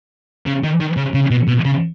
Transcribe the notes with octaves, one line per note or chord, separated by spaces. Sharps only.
C#3
D#3
D#3
C#3
C#3
B2
B2
C#3